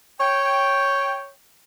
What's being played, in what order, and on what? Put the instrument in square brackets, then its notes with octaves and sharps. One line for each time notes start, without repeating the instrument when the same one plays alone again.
[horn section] C#5 G5